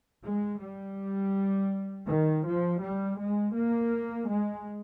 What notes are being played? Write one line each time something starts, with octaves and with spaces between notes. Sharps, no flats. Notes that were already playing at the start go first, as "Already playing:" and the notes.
G#3
G3
D#3
F3
G3
G#3
A#3
G#3